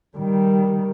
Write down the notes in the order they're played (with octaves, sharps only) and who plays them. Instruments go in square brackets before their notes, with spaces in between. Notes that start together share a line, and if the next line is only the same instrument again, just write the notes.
[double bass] D#3 G3